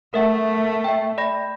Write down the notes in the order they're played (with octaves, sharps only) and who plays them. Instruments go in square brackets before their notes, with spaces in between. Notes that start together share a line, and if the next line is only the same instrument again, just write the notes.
[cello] A3 [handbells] A#4 E5 F#5
[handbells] E5 G5
D5 B5 A#6